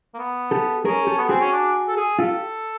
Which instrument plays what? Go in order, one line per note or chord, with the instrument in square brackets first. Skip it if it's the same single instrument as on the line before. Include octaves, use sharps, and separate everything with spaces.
[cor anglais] A#3
B3
[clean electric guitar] G4 A4
[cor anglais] C#4 [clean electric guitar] G#4 A#4
[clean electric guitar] G4 A4
[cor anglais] B3
[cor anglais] C4 [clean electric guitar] F#4 G#4
[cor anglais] C#4
D4
A4
G#4
[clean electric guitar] F4 G4 [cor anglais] A4